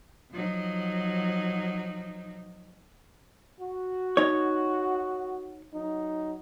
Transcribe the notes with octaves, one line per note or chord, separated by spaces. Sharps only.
F3 F#3 D#4
F#4
D#4 C#5
F#3 D#4